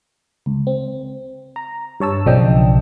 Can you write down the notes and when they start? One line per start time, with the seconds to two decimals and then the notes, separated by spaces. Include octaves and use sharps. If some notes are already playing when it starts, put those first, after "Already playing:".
0.46 C#2
0.67 C4
1.56 A#5
2.00 G2 C#5 A5 E6
2.26 B1 C#3 F3 D4 D#5 G5